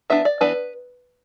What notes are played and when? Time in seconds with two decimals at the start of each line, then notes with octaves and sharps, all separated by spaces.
0.10 E3 B3 D4 E5
0.25 D5
0.41 E3 B3 D4 B4